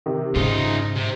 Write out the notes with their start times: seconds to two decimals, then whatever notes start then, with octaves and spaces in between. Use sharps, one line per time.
0.06 C3 D#3
0.36 G#2 C#3 D#4 F4 G#4
0.96 C3